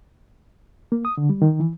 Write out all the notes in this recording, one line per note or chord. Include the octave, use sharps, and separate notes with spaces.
A#3
D#6
D3
G3
D#3
E3